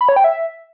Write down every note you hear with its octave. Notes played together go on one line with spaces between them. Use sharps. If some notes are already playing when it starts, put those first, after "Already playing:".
B5
C#5
G5
E5